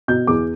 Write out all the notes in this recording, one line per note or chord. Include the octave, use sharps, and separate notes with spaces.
B2 G6
E2 D6